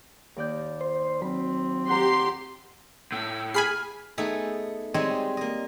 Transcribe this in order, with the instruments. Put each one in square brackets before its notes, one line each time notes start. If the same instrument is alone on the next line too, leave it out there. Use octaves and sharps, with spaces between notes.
[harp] D#2 D5 G6
[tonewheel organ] C5
[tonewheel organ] F#3 [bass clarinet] C4 [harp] B5
[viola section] G4 C6 [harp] F#5 A#5
[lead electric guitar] A2 [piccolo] E6
[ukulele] G#4 [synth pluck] G#5 B5 C7 [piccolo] F6
[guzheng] A3 B3 D#4 G#4 A4
G3 G#3 C4 D#4 C#5 D#5
A#3 D#5